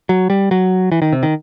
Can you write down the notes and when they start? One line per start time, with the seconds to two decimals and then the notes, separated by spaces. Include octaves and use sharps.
0.09 F#3
0.30 G3
0.51 F#3
0.92 E3
1.02 D#3
1.13 C3
1.23 D#3